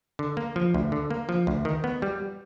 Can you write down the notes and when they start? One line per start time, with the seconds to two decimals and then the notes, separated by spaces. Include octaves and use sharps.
0.19 D3
0.37 A#3
0.56 F3
0.74 D2
0.92 D3
1.10 A#3
1.29 F3
1.47 D2
1.65 D#3
1.84 B3
2.02 G3